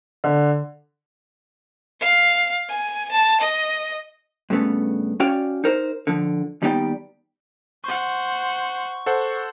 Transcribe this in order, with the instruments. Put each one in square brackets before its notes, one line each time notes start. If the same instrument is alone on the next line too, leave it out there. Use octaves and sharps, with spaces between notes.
[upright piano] D3
[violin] F5
G#5
A5
D#5
[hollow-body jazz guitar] G2 C#3 A3 B3
C#4 F#4 C#5 D5 F5 G5
D#4 A#4 C5
D3 F3
D#2 G3 B3 D#4 D5 G5
[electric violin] C5 F#5 [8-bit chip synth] C#6
[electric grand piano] A4 C5 F#5